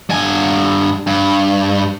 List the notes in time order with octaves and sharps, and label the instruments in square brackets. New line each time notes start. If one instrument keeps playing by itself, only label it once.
[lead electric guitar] G2 G#5
G2